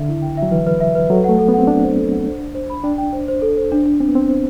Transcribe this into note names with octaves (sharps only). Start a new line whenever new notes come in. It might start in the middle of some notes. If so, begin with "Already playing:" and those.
Already playing: D3 E5
E4
G5
E5
F#3
E3 B4
B4
E5
B4
F#3 A4
A3 F#5
A4
B3
C4 F#5
D4 A4
C5
A4
F#5
C5
C5
C5
B5
D4 G5
G5
C5
C5
A4
C5
D4
D4
C4 D4
B3
C4 D4
C5